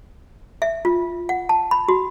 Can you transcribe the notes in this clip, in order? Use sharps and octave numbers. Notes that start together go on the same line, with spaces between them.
E5
F4
F#5
A5
B5
F#4